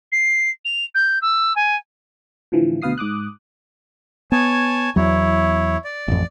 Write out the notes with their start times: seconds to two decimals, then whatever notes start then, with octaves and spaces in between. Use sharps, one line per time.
0.12 C7
0.65 F7
0.94 G6
1.22 E6
1.56 G#5
2.52 A2 D3 E3 F3
2.82 D2 B2 B4 F5 D#6 C7
2.98 G#2 D6 D#6 F#6
4.32 B3 C#5 G#5 A5
4.96 E2 F#3 E4 C#5
5.84 D5
6.08 A1 F2